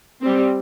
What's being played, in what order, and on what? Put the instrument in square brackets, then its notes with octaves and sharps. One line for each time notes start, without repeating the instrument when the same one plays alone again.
[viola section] G3 C4